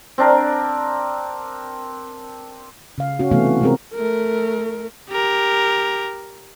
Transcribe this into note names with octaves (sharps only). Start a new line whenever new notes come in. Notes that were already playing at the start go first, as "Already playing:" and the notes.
C4 D4 A#4
C#3 F5
C#4 F#4
C3 E3 A3 B3 F#4 F5
F4
C3 G#3 C4 G#4 A#4
A3 A#4
G4 A#4